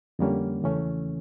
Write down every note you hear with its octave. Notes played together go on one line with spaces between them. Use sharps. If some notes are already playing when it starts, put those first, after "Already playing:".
F2 D3 G3 A#3 C#4
E2 C#3 E3 A3 C#4